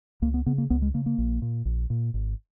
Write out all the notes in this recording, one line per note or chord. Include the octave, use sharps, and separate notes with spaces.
C#2 A#3
B3
C#3 B3
A#3
C#2 B3
G#3
C#3 A#3
A#3
A#1
A#2
A#1
A#2
G#1